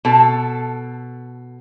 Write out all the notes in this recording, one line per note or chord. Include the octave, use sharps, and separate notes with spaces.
B2 A4